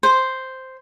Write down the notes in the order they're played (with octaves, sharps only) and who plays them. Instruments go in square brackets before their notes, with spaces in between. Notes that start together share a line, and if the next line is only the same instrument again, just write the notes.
[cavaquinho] C5